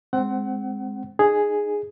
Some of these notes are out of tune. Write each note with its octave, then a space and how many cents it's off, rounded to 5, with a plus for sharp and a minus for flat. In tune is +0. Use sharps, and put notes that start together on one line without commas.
G#3 +0 C4 +0 F#5 +30
D#4 -30 G#4 +0